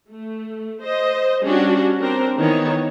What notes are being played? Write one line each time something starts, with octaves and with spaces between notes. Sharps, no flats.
A3
C5 D#5
G3 C#4 D4 F#4
C4 D4 A#4 C5
D#3 E3 B3 D#4 C#5